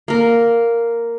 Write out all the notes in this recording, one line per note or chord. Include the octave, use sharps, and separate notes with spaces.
A#3 A#4